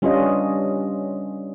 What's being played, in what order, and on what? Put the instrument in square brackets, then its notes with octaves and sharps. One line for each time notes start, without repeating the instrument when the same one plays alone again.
[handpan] G3 C#4 D4 F4 B4 D#5